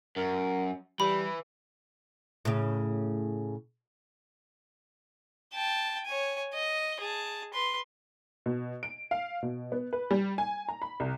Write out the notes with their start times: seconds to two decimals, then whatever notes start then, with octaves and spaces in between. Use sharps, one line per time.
0.16 F#2 A#4
1.00 E3 G3 B5
2.45 A2 C#3
5.54 G5 A5
6.06 C#5 G#5
6.53 D#5
7.00 G#4 A5
7.53 B4 C6
8.46 B2
8.83 D7
9.11 F5
9.43 B2
9.72 B3
9.93 B4
10.11 G3
10.38 G#5
10.69 A#5
10.82 B5
11.00 C2